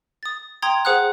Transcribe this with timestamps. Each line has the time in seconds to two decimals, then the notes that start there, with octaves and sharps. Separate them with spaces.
0.23 D#6 A6
0.62 G5 A#5 C6 D#6 G#6
0.85 G#4 C5 F#5 D#6 F6 F#6